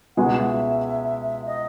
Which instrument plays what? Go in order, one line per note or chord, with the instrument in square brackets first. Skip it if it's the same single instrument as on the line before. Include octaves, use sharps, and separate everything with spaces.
[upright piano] C#2 B2 G#3 B3 F#4 [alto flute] F#5
[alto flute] E5
D#5